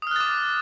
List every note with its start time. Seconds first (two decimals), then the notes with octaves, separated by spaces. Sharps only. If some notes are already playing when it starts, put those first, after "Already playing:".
0.02 D#6
0.07 F6
0.11 F#6
0.16 A6
0.20 D6